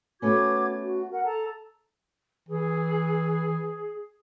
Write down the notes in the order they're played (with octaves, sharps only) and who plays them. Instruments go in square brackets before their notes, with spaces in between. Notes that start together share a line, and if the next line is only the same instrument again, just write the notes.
[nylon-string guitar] A3 B3 C#4 [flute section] F#4 D6 G#6
[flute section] F#4
A#4 F#5
A4 A5 A#5
[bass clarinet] E3 [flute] G#4